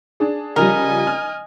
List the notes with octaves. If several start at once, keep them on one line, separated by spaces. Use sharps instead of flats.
D4 G#4
C#3 F3 G3 A#4 D#5 G#5
F6